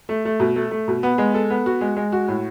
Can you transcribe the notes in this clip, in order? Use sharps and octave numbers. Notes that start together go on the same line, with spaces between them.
A3
A3
B2
A3
A3
B2
B3
G#3
A4
B3
F#4
G#3
G#3
F#4
A2